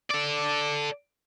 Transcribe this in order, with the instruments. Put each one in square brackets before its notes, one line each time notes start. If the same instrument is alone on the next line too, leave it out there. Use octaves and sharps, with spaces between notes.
[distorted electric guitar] A4 D5